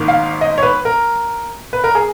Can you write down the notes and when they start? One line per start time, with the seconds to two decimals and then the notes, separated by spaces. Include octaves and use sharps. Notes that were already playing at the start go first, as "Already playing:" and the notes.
Already playing: G#1 G#2 D#3 A#3
0.08 F5
0.41 D#5
0.58 C#5
0.63 B4
0.85 A#4
1.73 B4
1.84 A#4
1.95 G#4